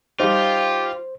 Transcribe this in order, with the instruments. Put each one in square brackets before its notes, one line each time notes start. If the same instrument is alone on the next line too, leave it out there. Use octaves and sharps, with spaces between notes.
[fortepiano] G3 D#4 [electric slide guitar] F4 [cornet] G4 [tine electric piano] C5